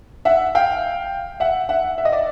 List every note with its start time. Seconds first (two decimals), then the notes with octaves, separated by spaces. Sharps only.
0.25 E5 F#5
0.55 F5 G5
1.40 E5 F#5
1.69 E5 F#5
1.98 E5
2.05 D#5
2.12 D5 E5